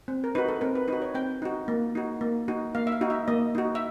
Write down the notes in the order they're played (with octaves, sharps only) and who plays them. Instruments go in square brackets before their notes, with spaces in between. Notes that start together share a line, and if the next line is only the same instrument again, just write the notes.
[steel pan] C4
A#4
D#4 F#4 B4
A4
C4 A#4
B4
D#4 B4
F#4
C#5
C4 G5
D#4 F#4
A#3
D#4 F#4
A#3
D#4 F#4
A#3 F5
E5
F5
D#4 F#4
E5
A#3 D#5
D#4 F#4
E5